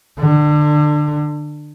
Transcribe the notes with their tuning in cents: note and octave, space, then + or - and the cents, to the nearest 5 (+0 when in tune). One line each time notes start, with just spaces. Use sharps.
D3 +25